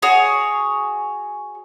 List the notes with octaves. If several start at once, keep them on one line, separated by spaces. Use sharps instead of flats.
F#4 G#4 C#5